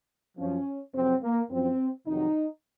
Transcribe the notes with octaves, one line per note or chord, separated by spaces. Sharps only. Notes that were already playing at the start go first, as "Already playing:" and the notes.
F#2 F3 C#4
F2 C3 F#3 C4
A#3
F#2 F3 C4
F2 C3 D#3 F#3 D#4